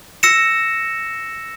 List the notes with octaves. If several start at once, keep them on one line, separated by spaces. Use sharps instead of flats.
E6 A#6 C#7 E7